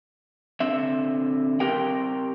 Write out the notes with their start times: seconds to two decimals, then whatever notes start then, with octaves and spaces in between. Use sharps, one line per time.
0.60 D3 C4 E5
1.60 C4 G4 A#4 G5